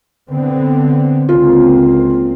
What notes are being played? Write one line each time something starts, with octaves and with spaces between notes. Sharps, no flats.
D3 B3 C4
C#2 A#3 C4 F4